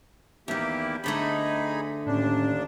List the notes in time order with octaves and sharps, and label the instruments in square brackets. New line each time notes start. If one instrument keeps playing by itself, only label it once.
[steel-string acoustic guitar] E2 D#3 [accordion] A#3 E4 G4
[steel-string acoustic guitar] D2 D3 A3 [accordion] D#4 G#4 B5
[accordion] D#2 D4 [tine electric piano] A2 C#4